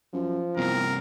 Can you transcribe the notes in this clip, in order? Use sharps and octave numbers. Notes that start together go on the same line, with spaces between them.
F#2 F3
E2 G2 C3 A#4